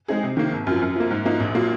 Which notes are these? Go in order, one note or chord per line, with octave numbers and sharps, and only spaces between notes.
G#3 C4 D#4 G#4
C3
D#3 A#3
G#1
F#2 F3
F#2
F3 A#3
G#2
F3 A#3 D#4
A#1
A#2 F#3 A#3 F4